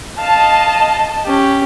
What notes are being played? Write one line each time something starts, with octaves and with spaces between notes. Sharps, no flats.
D#5 F5 A5
C#4 G4